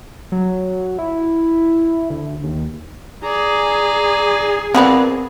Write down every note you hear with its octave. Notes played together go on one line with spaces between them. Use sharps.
F#3
E4
D2
D#2
G#4 D5 A#5
F3 B3 C4 A#4 B4 D5